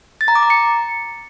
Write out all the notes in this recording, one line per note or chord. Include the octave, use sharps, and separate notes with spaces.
A6
A#5
D6
A#5
C#7